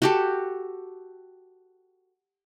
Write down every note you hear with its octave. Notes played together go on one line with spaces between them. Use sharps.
F#4 G4 A4